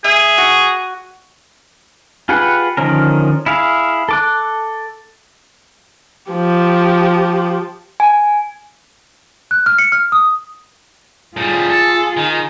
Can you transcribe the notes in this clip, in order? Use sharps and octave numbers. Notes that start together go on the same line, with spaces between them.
G#4 E5
F#4
F4 G4 G#4 B4 F#5
D3 D#3 F3 C#4 A#4
E4 G#4 F5
A4 D6 F#6
F3 G4
G#5
F#6
F6
C#7
F6
D#6
A2 G3 F4 G#4
A4
D#3